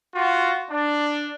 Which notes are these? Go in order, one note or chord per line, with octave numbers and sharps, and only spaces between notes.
F4 F#4
D4